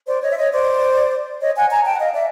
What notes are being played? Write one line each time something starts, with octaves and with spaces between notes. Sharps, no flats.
C5 D5
C#5 D#5
E5
C#5 D#5
C5 D5
C#5 D#5
F#5 G#5
G#5 A#5
G5 A5
F#5
D#5 F5
D5 E5